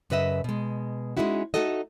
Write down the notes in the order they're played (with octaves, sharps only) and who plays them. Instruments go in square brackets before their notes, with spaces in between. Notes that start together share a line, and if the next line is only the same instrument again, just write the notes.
[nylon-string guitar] F#2 C#3 B4 D#5 E5
B2 G#3
G#3 A3 C#4 D#4 E4 F#4
A3 A#3 D#4 F#4 A4 D#5